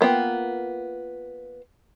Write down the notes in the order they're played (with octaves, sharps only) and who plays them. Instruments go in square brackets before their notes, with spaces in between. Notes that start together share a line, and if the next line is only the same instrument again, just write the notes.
[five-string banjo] A#3 B3 F4 G5